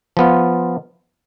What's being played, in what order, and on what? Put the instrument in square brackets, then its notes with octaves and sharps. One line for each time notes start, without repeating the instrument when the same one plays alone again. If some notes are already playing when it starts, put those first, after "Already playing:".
[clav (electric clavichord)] F3 B3 F4